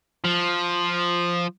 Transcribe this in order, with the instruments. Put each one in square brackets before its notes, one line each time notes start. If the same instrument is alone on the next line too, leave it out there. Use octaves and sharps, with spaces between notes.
[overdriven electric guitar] F3